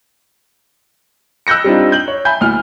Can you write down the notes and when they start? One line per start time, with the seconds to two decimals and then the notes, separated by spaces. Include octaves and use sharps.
1.47 E6 F#6 G6 A#6 C#7
1.64 G3 C4 D4 D#4 F4
1.92 G6 F#7
2.08 C#5
2.25 E5 G#5 B5 G6
2.41 D2 E4 F6